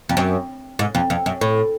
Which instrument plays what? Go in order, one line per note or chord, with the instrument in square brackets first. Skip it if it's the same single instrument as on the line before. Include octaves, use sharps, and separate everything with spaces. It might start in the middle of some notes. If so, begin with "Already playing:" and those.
[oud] F2
F#2
G#2
F2
F2
F#2
A2